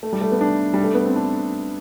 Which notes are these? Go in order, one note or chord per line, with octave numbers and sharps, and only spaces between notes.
A3
G3
A3
B3
D4
G3
A3
B3
C4
D4